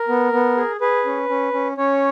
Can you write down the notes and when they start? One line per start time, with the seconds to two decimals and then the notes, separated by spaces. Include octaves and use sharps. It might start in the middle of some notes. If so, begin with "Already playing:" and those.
Already playing: A#4
0.08 B3
0.33 B3
0.57 G#4
0.81 G#4 B4
1.06 C#4
1.29 C#4
1.53 C#4
1.77 C#4 C#5